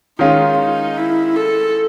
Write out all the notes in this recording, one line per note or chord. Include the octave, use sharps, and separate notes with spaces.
D#3 G#3 C#4 D#4 F4
D#4
E4
A4